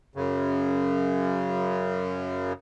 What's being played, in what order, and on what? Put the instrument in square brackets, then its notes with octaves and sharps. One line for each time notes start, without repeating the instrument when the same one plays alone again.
[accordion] F#2 C#3